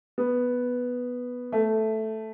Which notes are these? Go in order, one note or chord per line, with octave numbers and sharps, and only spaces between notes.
B3
A3